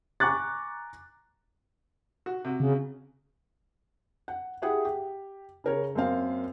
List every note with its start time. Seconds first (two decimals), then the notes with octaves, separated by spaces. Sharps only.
0.20 G#5 A#5 C#6 D6 F#6 A6
2.26 F#4
2.45 C3 F#4
2.60 C#3
4.28 F#5
4.62 E4 G4 G#4 F#5 G5
4.85 G4
5.64 C#3 A#4 C#5
5.96 F#2 A#3 C4 F5